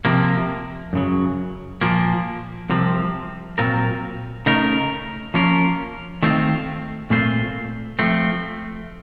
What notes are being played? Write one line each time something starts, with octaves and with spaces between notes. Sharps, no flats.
C3 F3 A#3
F#2 C#3 F#3
A#2 F3 A#3
C2 C3 F3 C4
A#2 F#3 C4 F4 A#4
C#3 A3 D#4 A#4
F3 A#3 C#4 F4 A#4
D#3 A3 C4 F4
A#2 A3 C4 F4 C5
F3 A3 C4